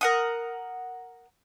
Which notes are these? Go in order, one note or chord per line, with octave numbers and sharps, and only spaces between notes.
A#4 F#5 D#6